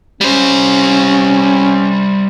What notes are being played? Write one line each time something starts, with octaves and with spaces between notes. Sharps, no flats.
G3 C#4 C5